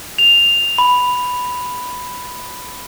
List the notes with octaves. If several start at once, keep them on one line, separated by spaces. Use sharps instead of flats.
F7
B5